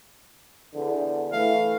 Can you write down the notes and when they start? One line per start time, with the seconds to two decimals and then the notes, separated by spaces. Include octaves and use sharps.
0.74 E2 D3
1.32 E3 A3 F5